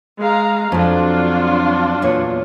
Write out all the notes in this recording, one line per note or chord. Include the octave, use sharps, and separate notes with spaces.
G#3 F5 A#5
F2 F#3 C4 D4 F4
E2 A#2 C#5